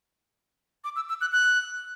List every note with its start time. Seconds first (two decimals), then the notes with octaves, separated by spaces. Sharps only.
0.84 D6
0.96 E6
1.09 E6
1.21 F#6
1.32 F#6